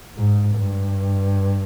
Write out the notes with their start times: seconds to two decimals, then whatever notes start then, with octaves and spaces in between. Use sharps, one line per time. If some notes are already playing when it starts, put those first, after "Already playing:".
0.17 G#2
0.56 G2